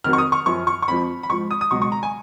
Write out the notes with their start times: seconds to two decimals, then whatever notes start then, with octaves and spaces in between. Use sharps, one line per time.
0.04 F2 D#3 F#3 F6
0.13 C#6
0.18 D#6
0.32 C#6
0.46 F#2 F3 C#6
0.67 C#6
0.82 C#6
0.88 F2 F3 B5
1.23 B5
1.29 G#2 F3 C#6
1.51 D#6
1.61 D#6
1.71 C#2 B2 F#3 C#6
1.82 C#6
1.92 A#5
2.03 G#5